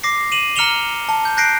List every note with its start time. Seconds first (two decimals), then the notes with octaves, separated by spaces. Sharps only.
0.03 D6 A#6 C7
0.32 D#7 E7 F#7
0.56 A#5 F6 C#7 E7 F7 G7
1.09 A5
1.25 G6
1.37 F#6 G6 A#6 C7 D7